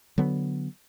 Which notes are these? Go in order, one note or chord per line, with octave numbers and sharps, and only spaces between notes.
D3 F#3 B3